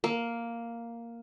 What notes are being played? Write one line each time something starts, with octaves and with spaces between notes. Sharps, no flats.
A#3